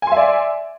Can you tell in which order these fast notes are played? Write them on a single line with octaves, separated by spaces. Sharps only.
G#5 C6 E5 D5